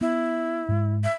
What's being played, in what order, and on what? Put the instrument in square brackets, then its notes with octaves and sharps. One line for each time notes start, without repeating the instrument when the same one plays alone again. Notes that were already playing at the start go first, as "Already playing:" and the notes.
[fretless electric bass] B3 [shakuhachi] E4
[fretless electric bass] G#2 G#3
[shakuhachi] E5